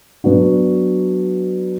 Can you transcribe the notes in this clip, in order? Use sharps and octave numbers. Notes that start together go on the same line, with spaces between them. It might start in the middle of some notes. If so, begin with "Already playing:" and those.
F#3 B3 D4 F#4